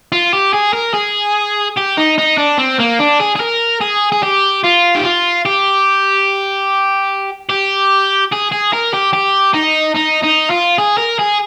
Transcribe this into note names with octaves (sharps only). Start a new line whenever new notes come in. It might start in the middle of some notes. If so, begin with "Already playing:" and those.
F4
G4
G#4
A#4
G#4
G4
D#4
D#4
D4
C4
A#3
D4
G#4
G#4
A#4
G#4
G#4
G4
F4
G4
F4
G4
G4
G#4
G#4
A#4
G4
G4
D#4
D#4
D#4
F4
G#4
A#4
G#4